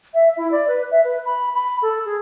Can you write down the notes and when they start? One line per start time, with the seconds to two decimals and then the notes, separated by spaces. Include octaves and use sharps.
0.14 E5
0.37 E4
0.51 D5
0.68 B4
0.91 E5
1.04 B4
1.25 B5
1.54 B5
1.82 A4
2.05 G#4